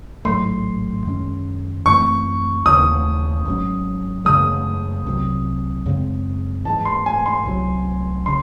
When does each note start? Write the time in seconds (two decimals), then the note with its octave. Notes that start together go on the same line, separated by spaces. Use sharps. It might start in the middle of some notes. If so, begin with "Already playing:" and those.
0.25 A1 G#2 F#3 A3 C6
1.05 F#2 D#3 G#3 C#4
1.86 F#2 E3 A3 C4 C#6
2.65 D#2 C#3 E3 D#6
3.45 G#1 G#2 F#3 C#4
4.25 F#2 C#3 E3 G#3 D#6
5.06 C2 C3 F#3 C4
5.86 F#2 C#3 G#3 C4
6.65 G#2 E3 G#3 A5
6.85 C6
7.06 G#5
7.26 C6
7.46 C2 C3 F#3
8.26 C#3 C6